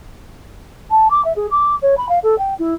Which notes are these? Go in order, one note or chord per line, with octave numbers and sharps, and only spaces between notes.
A5
D6
E5
G#4
D6
C#5
B5
F5
A4
G5
E4